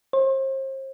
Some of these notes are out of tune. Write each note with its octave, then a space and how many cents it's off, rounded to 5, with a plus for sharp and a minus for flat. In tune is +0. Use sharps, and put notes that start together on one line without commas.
C5 +40